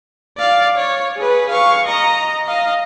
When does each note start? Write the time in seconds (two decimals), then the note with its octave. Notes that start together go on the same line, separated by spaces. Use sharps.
0.37 D5 F5
0.77 C#5
1.17 G#4 B4
1.49 F5 C#6
1.86 D#5 A#5
2.47 D#5 F5